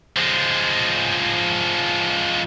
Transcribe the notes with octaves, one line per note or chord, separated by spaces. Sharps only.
F3 G#3